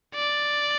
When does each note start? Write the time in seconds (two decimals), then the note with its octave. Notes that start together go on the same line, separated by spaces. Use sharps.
0.15 D5